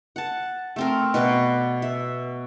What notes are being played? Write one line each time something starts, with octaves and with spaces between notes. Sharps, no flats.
F#5 A5
A3 C4 A#4
B2 F#4 B4 D5
E5